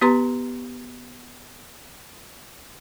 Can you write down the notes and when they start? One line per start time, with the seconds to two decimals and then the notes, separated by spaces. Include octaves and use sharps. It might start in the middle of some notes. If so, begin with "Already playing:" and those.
0.01 B3 G4 B4 A#5 C6